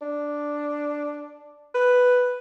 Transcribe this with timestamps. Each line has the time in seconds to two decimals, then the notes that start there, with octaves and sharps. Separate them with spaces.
0.02 D4
1.74 B4